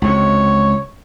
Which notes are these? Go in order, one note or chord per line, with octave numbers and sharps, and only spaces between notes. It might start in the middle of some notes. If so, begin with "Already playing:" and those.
C#2 C3 C#5